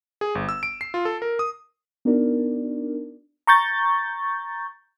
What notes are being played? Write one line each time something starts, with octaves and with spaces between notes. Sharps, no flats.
G#4
G1
E6
D7
C7
F4
A4
A#4
D#6
B3 D4 D#4 F#4 A#4 D5
A#5 C#6 G6 A6